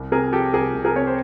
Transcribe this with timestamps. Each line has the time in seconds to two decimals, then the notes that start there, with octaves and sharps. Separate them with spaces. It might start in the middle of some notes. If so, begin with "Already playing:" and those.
Already playing: C2
0.12 C3 G#4 A#4
0.33 F3 G4 A4
0.53 C2 G#4 A#4
0.74 C2
0.85 G#4 A#4
0.96 C3 C#5
1.07 C5